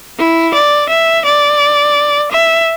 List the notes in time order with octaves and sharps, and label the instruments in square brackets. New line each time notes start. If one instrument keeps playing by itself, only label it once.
[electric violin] E4
D5
E5
D5
E5